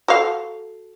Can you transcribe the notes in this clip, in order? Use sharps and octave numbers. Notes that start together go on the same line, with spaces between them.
F#4 A4 F5